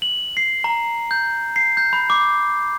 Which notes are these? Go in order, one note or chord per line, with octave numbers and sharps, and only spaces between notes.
F#7
C7
A#5
G6
C7
G6
B5
D6